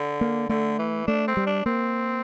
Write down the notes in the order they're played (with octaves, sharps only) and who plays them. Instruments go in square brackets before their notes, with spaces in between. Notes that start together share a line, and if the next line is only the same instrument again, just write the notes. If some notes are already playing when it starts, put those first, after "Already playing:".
Already playing: [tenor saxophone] D3
[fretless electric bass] A#3
[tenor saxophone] D3 [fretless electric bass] A3
[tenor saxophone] E3
[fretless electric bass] A3 [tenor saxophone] D4
[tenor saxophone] C4
[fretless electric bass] G3
[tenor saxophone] D4
[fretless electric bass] A#3 [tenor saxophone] C4